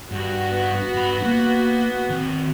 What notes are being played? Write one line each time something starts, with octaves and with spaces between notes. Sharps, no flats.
G2 F#4
B3
G2 B5
A#3
D#3 C4